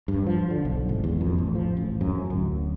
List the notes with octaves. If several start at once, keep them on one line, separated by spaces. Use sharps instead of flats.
G2
F3
D3
B1
G#1
E2
F2
A1
F3
A1
F#2
D1